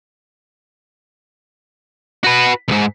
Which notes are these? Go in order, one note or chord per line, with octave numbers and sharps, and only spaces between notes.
F#4 B4
B1 G#2